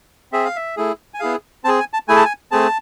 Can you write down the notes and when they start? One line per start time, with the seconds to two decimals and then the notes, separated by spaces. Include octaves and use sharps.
0.32 C4 G#4 E5
0.45 F5
0.56 E5
0.77 A3 E4 G#4
1.14 G#5
1.20 B3 E4 G#4 F5
1.64 C4 A5
1.68 G#4
1.80 G#5
1.93 A5
2.08 A3 E4 G#4 G#5
2.16 A5
2.25 G#5
2.51 A3 C4 G#4 A5